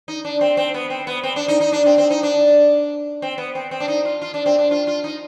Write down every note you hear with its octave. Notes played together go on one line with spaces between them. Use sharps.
D#4
D4
C4
C4
B3
C4
B3
C4
D4
D#4
D#4
D4
C4
C4
D#4
D4
C4
B3
C4
C4
D4
D#4
F4
F4
D4
C4
D4
F4
F4
D#4